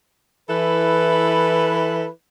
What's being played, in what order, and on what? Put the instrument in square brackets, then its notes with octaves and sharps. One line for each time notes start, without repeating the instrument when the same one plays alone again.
[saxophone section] E3 E4 A4 B4